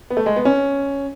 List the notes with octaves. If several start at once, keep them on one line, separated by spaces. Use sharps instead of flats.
B3
A3
G#3
B3
C#4